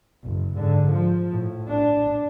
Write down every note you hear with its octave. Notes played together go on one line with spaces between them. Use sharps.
F#1
G#2 D3
F3
A2
D4